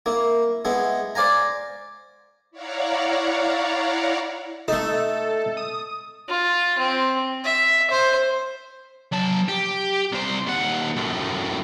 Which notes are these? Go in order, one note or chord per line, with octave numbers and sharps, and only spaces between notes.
A#3 E4
G#3 B3 E4
C5 D5 F5 G#5 A#5
E4 C#5 D5 F5 F#5 A#5
A3 D#4 A4
D#6
F4
C4
E5
C5
F#3 A5
G4
C2 C5
D#2 F#5
F#2 A2